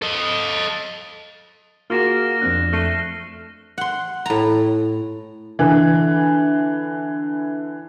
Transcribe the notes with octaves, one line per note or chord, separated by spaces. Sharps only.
A4 D#5
A#3 F4 F#4 G#4 F6 A#6 E7
F2 C4 D4 F#6
A3 F6 C7 D#7
F#5 C6
A2 A#5
D3 E3